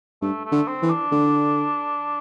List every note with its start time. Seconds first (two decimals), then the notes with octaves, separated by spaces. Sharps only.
0.22 G2 A3
0.45 A3
0.52 D3
0.67 C4
0.82 E3
0.90 D4
1.11 D3